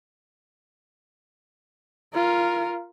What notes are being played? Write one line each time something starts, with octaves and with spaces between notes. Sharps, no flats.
F4 A#4